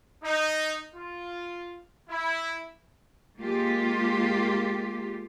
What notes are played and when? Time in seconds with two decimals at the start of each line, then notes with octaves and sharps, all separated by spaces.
0.24 D#4
0.95 F4
2.09 E4
3.38 G#3 A#3 F4 G4